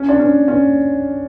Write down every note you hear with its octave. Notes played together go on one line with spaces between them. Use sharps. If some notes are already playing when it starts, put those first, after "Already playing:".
Already playing: C#4
D4
C#4
C#4